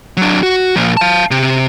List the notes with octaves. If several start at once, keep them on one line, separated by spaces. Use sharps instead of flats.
F#3 D4
F#4
A#2 F3
F5 A5
C3